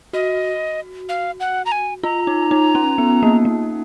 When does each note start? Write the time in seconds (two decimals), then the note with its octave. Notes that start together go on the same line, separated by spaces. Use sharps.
0.13 F#4 D#5
1.09 F5
1.40 F#5
1.66 A#5
1.72 G#5
2.03 F4 A#5
2.27 D#4
2.51 D#4
2.75 C#4
2.98 B3
3.23 A#3
3.45 A#3